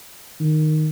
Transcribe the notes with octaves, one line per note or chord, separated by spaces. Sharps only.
D#3